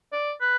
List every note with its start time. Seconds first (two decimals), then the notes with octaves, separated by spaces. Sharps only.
0.12 D5
0.41 B4